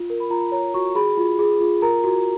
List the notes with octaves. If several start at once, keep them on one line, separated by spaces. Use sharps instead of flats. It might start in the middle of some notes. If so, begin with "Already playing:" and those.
Already playing: F4
A#4
B5
F4 A#5
A#5
C#5 A#5
F#4 C#6
G#4 B5
F4
G#4
F4
A#4 A#5
F#4